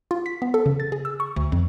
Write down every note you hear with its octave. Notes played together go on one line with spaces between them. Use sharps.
F4
B6
B3
A4
C#3
A6
G#4
E6
C#6
D2
F2